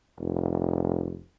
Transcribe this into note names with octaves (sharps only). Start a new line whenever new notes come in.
F1